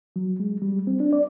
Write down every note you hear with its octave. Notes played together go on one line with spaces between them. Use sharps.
F#3
G#3
G3
C4
D4
D5